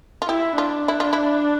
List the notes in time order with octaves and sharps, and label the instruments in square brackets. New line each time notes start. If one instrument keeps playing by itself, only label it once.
[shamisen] F4
[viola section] E4 [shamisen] G4
[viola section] D4 [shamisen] F4
[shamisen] E4
F4
E4